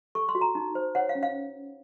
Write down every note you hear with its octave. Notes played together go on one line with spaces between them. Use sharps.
A4 C#6
C6
F#4
A#5
D#4
C5
C#5 F#5
F5
C#4
F5